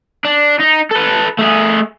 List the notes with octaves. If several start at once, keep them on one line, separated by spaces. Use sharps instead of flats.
D4
D#4
A4 B4
A3 G#4